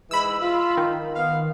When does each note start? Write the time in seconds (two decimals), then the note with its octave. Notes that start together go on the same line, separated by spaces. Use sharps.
0.11 G#2 E3 G#3 B5 E6
0.42 F4
0.77 D#3
1.16 B3 F5